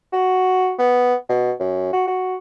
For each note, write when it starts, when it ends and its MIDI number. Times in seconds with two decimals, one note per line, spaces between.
0.13 0.73 66
0.79 1.15 59
1.29 1.52 47
1.60 1.91 42
1.93 2.04 66
2.08 2.35 66